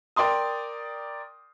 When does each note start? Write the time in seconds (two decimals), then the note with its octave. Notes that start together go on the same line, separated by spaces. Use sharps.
0.16 A#4 D5 G5 C6 D#6